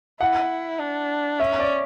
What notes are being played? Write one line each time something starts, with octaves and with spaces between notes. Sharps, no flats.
E4 F#5
D4
C#4 E5
D5